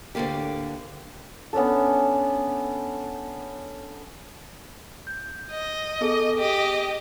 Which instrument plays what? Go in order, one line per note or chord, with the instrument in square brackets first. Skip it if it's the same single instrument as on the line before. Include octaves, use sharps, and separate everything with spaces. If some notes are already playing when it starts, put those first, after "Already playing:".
[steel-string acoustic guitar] D2 A2 D3 A#3 G4
[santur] B3 C#4 D4 A4
[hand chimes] G6
[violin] D#5
[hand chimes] B3 G#4 A4
[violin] G4 D#5 [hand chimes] G#4